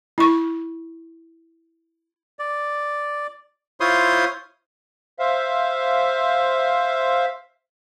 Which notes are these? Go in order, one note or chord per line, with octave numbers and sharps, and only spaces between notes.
E4 C#6
D5
E4 F4 C5 C#5 C6 D#6
C5 E5 F5